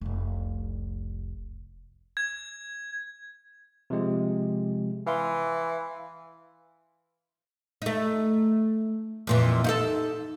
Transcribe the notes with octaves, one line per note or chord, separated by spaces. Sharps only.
F1 C2
G#6
C3 F3 G#3
E3 F5 C6
A3 D#4
F2 A#2 E3
D#4 F#4 A4